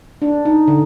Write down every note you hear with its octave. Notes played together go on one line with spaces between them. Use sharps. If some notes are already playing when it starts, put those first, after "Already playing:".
D4
D#4
D3